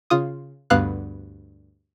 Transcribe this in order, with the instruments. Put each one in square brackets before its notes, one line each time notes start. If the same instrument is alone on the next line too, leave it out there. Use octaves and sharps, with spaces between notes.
[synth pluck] C#3 F4 D#6
D2 G2 B3 F5 F#6